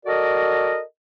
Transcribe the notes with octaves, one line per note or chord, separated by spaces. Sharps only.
F#4 A4 A#4 D5 D#5